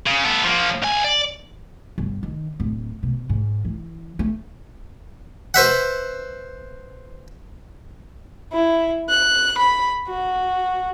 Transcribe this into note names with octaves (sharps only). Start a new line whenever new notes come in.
C#3
B3 A4
F3 A#3
B1 G#5
D5
G1
D#3
D1
B2
G#2
E3
A3
B4 C5 E5 F#5
E4
F#6
B5
F#4